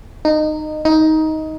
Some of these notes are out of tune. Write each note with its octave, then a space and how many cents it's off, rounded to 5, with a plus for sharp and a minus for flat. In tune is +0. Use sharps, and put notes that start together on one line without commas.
D#4 -20
D#4 +15